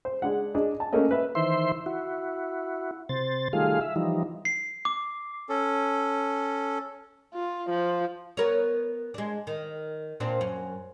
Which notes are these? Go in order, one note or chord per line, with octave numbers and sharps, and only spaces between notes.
C5
G#3 D4 F#5
D4 G#4 D#5
A5
A3 A#3 C#4 D#5
B4 E5
D#3 E3 C5 E5 C6
E4 F#4
C3 C5 A6
D#3 G3 A3 F4 G#4 F5
E5
E3 F3 G3 D#4
C7
D6
C#4 A4
F4
F3
B3 A#4 C#5
G#3 D4
D#3
A#2 C4 D4
F#2